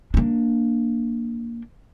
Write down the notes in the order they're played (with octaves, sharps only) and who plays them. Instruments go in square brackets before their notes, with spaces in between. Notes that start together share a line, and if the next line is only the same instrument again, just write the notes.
[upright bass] A#3 D4